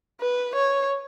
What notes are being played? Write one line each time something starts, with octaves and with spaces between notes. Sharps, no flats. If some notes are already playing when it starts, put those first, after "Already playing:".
B4
C#5